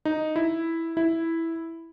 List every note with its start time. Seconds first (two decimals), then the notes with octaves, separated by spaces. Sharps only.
0.05 D#4
0.36 E4
0.97 E4